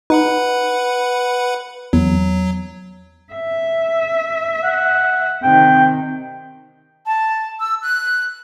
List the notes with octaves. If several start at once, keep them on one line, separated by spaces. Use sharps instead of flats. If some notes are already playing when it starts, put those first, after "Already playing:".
D#4 B4 F#5 B5
E2 F#3
E5
F#5
C3 D#3 G5
A5
E6
F#6